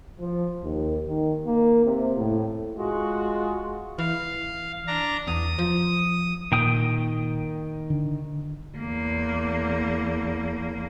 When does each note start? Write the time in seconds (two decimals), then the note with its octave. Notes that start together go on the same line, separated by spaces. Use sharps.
0.19 F3
0.63 D#2
1.08 D#3
1.46 A#3
1.85 C3
2.17 A2
2.78 G#3 F4 F#4
3.98 E3 F5
4.87 D4 A#5
5.27 E2 D#6
5.58 F3
6.52 A#2 D#3 G5 D#6
7.90 D3
8.78 E2 A#3